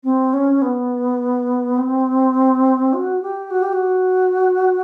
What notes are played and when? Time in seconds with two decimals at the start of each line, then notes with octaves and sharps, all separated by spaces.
0.04 C4
0.33 C#4
0.62 B3
1.77 C4
2.93 F#4
3.22 G4
3.50 F#4
3.62 G4
3.73 F#4